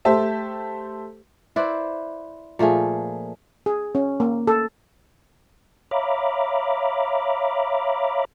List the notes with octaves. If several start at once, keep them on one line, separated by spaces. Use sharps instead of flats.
A3 G4 C5 E5 A5
E4 B4 C5 D5
A#2 F3 A3 G#4
G#4
C#4
A#3
A4
C#5 E5 F5 A#5 B5 D6